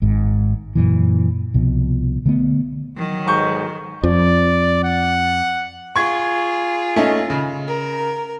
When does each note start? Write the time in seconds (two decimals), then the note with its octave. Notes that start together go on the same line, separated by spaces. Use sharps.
0.02 G#1 G#2
0.75 F#2 A#2 E3
1.54 C2 B2 F3
2.26 D3 A3 B3
2.97 D#3 F#3
3.27 B1 G#2 A#5 C#6 G6
4.03 F2 F3 D5
4.84 F#5
5.96 F4 G#4 C#6 G#6
6.96 A3 C#4 D#4
7.30 C#3
7.67 A#4